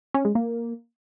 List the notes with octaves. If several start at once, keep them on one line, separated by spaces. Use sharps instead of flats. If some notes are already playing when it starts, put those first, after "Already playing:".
C#4
G#3
A#3